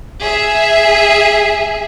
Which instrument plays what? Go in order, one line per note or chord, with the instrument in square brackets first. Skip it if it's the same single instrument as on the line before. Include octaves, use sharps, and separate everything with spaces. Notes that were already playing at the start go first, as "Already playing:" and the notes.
[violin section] G#4 E5